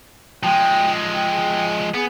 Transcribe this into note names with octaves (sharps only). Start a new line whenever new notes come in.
F3 G#3 G5
G5
B3 G#4